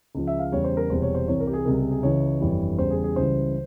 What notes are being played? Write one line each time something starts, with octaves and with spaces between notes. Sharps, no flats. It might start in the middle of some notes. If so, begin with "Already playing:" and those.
C#2 C#3 F3
E5
F5
E2 C#3 G3 C#5
C5
A#4
E1 E2 C3 G3 C5
C#5
C5
C2 C3 E3 C#5
A#4
G4
G#4
C#2 C3 G3 A#4
G#4
G#4
C#2 C#3 E3 C#5
G1 F2 E3 G3
E2 C#3 G3 C5
G#4
G#4
C#2 C#3 E3 G3 C5